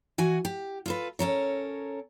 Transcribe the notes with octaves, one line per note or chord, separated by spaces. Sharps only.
E3 F#4 G#5
G4
F4 A4 B4
C#4 A4 A#4 C#5